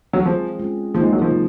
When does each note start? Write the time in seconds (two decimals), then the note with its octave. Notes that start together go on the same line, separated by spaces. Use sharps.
0.13 F#3
0.25 F3 G#3 C4 F4 G#4
0.59 G#3 C#4 G#4
0.94 D#3 F3 A#3 D#4 G#4
1.03 G#3
1.13 F#3
1.21 F3
1.31 C#3 F#3